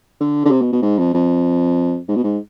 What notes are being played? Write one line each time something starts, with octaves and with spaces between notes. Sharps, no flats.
D3
D3
C3
B2
B2
G#2
F2
F2
G#2
B2
G#2